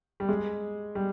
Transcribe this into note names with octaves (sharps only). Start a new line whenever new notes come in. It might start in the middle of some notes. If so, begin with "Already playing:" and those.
G3
G#3
G3